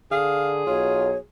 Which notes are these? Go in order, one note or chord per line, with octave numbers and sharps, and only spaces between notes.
D3 G#4 F5
B1 F4 C#5